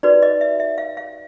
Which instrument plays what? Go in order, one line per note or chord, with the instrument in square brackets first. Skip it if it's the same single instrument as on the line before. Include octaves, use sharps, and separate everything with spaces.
[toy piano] D#4 F#4 B4 D5
D#5
E5
E5
F5
F5